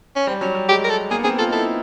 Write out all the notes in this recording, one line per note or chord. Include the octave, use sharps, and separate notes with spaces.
C#4
G3 C4
F#3 C#4
G3
G#3 G4
A#4
A4
A#3 G#4
B3
C4 G#4
F4 A4
D#4
E4 A4